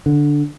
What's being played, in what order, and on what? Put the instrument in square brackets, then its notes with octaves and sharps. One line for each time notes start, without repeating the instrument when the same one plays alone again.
[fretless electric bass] D3